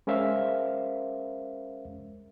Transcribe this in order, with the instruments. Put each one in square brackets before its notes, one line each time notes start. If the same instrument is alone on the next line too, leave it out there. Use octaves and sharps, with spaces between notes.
[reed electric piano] G#3 C#4 A#4 C5 E5 F5